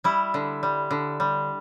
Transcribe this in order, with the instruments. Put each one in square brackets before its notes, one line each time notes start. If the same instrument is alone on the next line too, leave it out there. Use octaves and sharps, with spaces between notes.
[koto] G3 E4
D3
G3
D3
G3